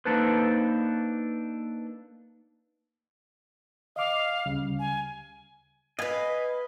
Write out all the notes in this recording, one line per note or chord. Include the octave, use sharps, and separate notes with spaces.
A#3 D4 D#4 A4 B4 C5
D#5 F5 D6
D2 C#3 G3
G#5
B4 D#5 F5 G#5 B5